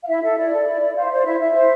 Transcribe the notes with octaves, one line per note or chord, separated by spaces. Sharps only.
F5
E4 E5
A4 E5
E4 D5
A4
E4
E4
C5 F5
E5
C5 D5
E4 E5
E4 E5
C5